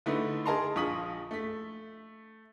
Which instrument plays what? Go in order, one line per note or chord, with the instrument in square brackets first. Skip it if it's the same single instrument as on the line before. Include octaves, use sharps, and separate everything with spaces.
[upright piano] D3 A3 D#4 E4 B4
G#4 A#4 D#5 A5 A#5 C6
A#1 F3 C#6 D#6 B6 F#7
A3 B6